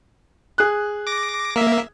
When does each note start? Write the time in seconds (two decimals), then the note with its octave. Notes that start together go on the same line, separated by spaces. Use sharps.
0.58 G#4 F#6
1.07 D6 A#6
1.56 A#3 E5